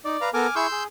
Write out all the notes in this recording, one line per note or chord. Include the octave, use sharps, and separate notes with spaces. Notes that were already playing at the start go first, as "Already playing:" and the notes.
D#4 D5
B4 F5 A#5
B3 A4 A#4 G#5 D6 F6
E4 G#4 C6 C#6 E6 G6
G#4